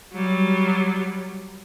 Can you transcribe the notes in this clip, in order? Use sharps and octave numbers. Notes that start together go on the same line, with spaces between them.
F#3 G3